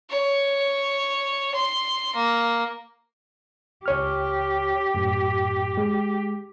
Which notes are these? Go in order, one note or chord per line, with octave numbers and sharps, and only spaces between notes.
C#5
C6
A#3
C#2 G4 C#5 F6
F#2 A2
G#3